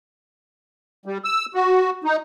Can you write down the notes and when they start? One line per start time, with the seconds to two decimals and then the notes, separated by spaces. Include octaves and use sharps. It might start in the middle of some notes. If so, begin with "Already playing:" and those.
1.06 G3
1.25 E6
1.55 F#4
2.04 D#4